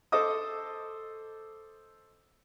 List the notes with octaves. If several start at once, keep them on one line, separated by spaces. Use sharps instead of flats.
A4 C5 D#5 D6 D#6